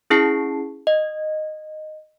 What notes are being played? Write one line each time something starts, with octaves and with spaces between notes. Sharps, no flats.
C#4 E4 G#4 A5 C7
D#5